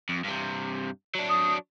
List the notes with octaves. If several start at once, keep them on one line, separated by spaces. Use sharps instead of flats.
F2
G2 C3
F#3 D4
D#6